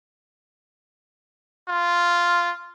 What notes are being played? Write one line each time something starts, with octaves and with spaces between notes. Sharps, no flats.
F4